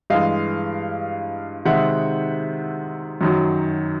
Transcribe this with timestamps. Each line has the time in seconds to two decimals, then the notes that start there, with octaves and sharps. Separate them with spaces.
0.10 G2 E3 G#3 D#5 F5
1.65 C3 D#3 G#3 E5 F#5
3.21 F#2 D#3 F#3